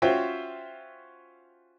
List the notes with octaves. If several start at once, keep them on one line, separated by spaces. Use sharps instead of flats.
C#4 F4 F#4 C5 E5 G5